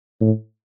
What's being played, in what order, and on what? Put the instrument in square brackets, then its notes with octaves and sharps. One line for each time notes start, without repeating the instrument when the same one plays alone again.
[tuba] A2